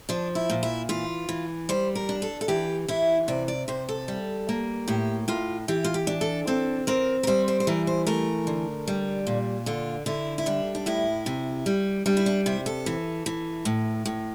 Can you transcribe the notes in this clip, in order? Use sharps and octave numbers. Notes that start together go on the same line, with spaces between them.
F3 D4
E4
A#2
E4
E3 F4
E3
G3 C5
A#4
D4
A4
A4
E3 G4
E3 E4
C3 D5
D5
C3 C5
A4
G3
A#3
A2 G4
A2 F4
E3 G4
F4
G4
D4
A4
C4 A4
C4 A#4
A#4
G3 C5
C5
C5
E3 A#4
C5
A3 A#4
D3
G3
A#2
D3 F4
D3 E4
E4
G3 D4
D4
A2 E4
C3
G3
G3 D4
E4
D4
C3 E4
A4
E3
E3
A2
A2